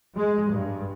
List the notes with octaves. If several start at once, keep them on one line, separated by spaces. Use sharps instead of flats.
G#3
G2